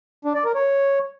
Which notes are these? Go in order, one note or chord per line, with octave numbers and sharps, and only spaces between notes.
D4
D5
A#4
C#5